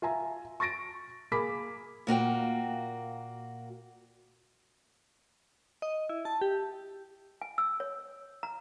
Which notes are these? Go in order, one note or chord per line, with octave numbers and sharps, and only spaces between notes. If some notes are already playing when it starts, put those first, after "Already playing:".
F4 E5 G#5 A#5
C#6 A6 A#6 D7
A#3 G#4 B5 D6 B6
A#2 A#3 F#4 G5
D#5
E4
A5
G4
G#5
E6
C#5
A#5